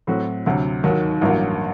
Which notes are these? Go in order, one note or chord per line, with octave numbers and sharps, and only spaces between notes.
A2 F#3 C4 F#4
D2 C3 F#3
D#2 D#3 F#3
A1 G2 F#3 A#3